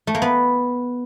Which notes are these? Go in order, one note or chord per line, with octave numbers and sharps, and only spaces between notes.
A3
A#3
B3